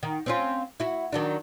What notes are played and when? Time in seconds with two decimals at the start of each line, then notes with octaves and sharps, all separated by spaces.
0.03 D#3
0.26 C4 C#4 F4
0.80 E4 F#4
1.13 D#3 F#3 D4